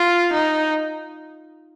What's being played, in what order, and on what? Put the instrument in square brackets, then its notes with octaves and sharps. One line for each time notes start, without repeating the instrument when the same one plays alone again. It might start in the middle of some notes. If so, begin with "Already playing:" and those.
Already playing: [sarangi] F4
D#4